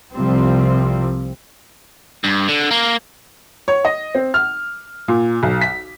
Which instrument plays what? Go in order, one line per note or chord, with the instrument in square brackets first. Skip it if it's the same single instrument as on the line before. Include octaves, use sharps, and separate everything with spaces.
[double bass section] C2 C3 F3 G3 C4
[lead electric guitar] G2
D3
A#3
[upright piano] C#5
D#5
C4
F6
A#2
B1
B6